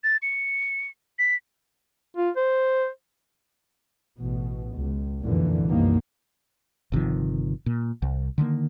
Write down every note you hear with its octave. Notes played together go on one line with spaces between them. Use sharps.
A6
C#7
B6
F4
C5
A1 B2
C#2
F1 F#2 A#2 D3 E3
C2 F#2 B2 D#3 A#3
G1 C3 D#3 F3
A#2
C2
D3 D#3 G#3 A#3